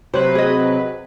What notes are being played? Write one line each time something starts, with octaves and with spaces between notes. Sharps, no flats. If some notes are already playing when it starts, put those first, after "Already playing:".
C3 F#3 B4 C5
G#4 D#5